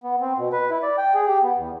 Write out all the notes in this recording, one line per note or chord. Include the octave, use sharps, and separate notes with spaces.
B3
C4
B2
B4
E4
D5
G5
G#4
G4
B3
E2